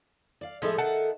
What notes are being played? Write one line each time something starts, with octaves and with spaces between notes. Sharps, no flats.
D5 F5
A2 F3 G#3 G#4 A4 E5
D#3 F#5 A5